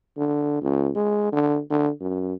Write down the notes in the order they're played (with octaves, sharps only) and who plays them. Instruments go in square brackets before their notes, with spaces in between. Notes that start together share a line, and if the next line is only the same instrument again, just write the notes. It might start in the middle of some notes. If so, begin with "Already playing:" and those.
[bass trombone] D3
C#2
G#3
D3
D3
F#2